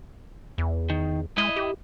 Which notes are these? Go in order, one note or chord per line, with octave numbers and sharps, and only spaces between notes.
E2
D#3
G#3 E4 D#5
G4